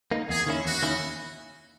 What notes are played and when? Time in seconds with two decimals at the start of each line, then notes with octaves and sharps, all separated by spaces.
0.11 A#3 D#4
0.29 E2 G#4
0.47 D#3 A#3 C#4 E4
0.65 E2 F#4
0.82 D#3 A#3 C#4 E4